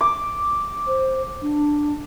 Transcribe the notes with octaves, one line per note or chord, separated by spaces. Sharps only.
D6
C5
D4